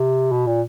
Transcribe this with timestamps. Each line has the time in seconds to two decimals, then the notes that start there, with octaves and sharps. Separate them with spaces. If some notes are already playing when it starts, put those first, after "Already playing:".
Already playing: C3
0.32 B2
0.47 A#2